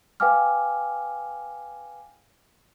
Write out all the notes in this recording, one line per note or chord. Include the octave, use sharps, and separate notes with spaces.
B4 F5 G5 G#5 D6 F6